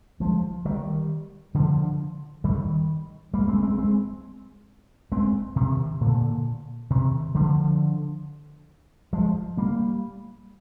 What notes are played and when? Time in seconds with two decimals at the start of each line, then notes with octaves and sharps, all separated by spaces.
0.20 F3 G#3
0.65 D#3 G3
1.54 D3 F3
2.44 D#3 G3
3.34 G3 A#3
3.48 G#3 C4
3.63 G#3 C4
3.78 G#3 C4
5.12 G#3 C4
5.56 C3 D#3
6.01 A#2 D3
6.90 C3 D#3
7.35 D3 F3
9.13 F3 G#3
9.57 G3 A#3